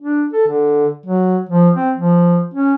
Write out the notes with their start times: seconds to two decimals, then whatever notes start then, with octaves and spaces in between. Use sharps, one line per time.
0.01 D4
0.33 A4
0.47 D3
1.06 F#3
1.49 F3
1.75 C4
1.96 F3
2.53 C#4